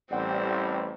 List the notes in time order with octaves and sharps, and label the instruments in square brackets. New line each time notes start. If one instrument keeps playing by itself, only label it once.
[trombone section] A1 G3 [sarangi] C4 [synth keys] D5 F#5 G5